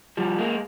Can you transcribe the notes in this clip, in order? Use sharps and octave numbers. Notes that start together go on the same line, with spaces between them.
F3 G3
G#3 A#3